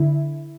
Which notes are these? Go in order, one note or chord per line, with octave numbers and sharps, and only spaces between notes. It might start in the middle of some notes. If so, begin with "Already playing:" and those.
Already playing: D3 E4